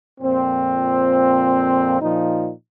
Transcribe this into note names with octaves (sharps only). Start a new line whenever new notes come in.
F2 A#2 C4
A#2 F3 D#4